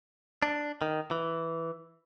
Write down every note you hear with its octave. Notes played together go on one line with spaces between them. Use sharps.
D4
D#3
E3